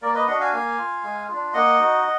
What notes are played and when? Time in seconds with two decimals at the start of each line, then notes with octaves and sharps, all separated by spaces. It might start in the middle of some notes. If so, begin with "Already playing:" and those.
0.02 A#3 A#4 D5
0.15 B4 D#5
0.27 D4 F#4 D#5 F#5
0.41 F5 G#5
0.52 A#3 F5 G#5
0.78 F4
1.03 G#3
1.29 D4 F4
1.54 A#3 D#5 F#5
1.79 D#4 F#4